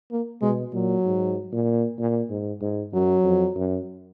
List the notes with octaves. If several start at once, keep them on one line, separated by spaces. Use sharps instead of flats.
A#3
B2 G#3
A#2 F#3
G#2
A#2
A#2
G#2
G#2
F#2 F#3
F2
F#2